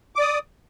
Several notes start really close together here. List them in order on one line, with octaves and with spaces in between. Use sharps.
D6 D5 D#6